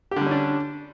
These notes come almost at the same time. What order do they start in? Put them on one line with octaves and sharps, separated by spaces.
G4 D3 G3 C#4 D4